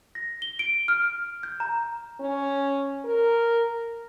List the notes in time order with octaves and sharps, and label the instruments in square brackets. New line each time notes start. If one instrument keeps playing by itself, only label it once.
[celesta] A#6
G7
D7
F6
G6
A#5
[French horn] C#4
A#4